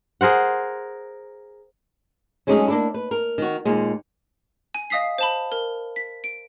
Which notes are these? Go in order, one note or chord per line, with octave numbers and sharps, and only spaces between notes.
G#4 A#4 C5 F#5
F#3 G#3 A3 C#4 D#4 G#4
A#3 D4 E4
B4
A#4
D#3 F#4
D#2 A#2 G#3
G#5
D#5 F5 D#6 B6 C7
C5 A5 B5
A#4
B6
D7